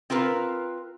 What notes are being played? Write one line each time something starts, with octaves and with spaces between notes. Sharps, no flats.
C4 F4 A#4 B4